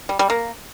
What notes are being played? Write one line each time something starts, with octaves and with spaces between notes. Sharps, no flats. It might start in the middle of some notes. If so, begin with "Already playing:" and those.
G3
G3
A#3